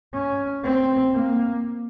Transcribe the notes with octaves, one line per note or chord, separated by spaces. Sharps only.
C#4
C4
A#3